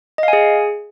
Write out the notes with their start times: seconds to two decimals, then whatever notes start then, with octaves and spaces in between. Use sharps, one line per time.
0.18 D#5
0.23 F5
0.28 G#5
0.33 G#4